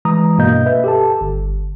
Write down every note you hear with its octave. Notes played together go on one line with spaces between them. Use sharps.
E3 G#3 A#5 D#6
G2 B2 A#3 D#5 G6
B4 E5
G4 A4 A5
G1